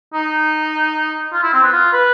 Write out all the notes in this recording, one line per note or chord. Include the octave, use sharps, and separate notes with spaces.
D#4
F4
E4
C4
B3
F4
B4